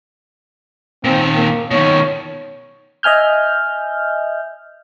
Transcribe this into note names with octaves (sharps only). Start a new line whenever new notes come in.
A#2 D#3 C4
A#3
B2 D#3 C#5
D#5 E5 G#5 F6 G6